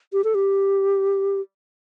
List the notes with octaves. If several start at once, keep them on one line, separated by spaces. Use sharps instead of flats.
G4
A4
G4